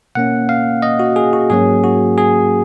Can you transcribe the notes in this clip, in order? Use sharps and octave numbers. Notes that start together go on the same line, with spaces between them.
B2 A#3 C#4 F#5
F5
D#5
F#4
G#4
F#4
G#2 F#3 A#3 C#4 G#4
F#4
G#4